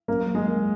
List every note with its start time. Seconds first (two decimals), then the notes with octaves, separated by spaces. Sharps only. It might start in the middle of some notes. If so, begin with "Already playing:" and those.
0.08 F#2 A#3 A#4
0.27 A#3
0.35 G#3 G#4
0.48 A#3